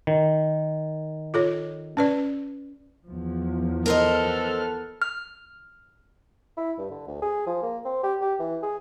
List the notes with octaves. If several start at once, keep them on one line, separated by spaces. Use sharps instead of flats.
D#3
F4 A4 C#5
C#4 B4 D5
E2 F3
B3 A4 A#4 C5 D#5 F6
F6
E4
G2
D3
D2
G#4
F3
A#3
C4
G4
G4
E3
G#4